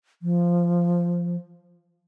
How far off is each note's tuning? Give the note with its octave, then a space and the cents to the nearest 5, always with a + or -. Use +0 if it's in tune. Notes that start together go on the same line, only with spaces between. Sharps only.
F3 -10